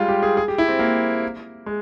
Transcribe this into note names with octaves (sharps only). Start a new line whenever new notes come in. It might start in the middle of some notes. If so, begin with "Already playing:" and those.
Already playing: G3 G#3 F4
G4
G#4
G#4
G4
E4
C4
A#3
G#3